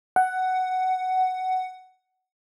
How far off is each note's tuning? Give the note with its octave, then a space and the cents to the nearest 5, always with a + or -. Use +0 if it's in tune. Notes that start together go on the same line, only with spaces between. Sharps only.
F#5 +10